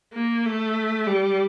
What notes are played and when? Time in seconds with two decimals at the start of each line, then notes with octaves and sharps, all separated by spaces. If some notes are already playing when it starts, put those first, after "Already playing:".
0.13 A#3
0.45 A3
1.07 G3